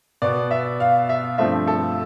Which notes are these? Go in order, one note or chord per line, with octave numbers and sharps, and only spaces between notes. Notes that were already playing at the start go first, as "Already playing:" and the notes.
B2 B3 D5
E5
F5
E5
G2 F3 A3 C4 E5
A4